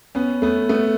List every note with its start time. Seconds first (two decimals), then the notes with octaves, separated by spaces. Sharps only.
0.15 B3 C#4
0.42 A3 B3
0.69 A3 B3